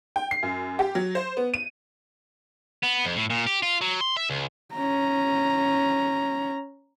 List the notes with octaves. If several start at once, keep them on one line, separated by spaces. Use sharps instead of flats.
G5
C7
F#2
G4
F#3
C5
B3
D#7
B3
F2
A2
A#2
G4
F4
F#3
C6
E5
C#2
C#4 A#5